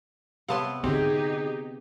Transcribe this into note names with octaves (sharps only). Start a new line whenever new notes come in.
C3 B3 C#5 F5 A5 C6
G#2 B2 D3 C4 D#4 G4 G#4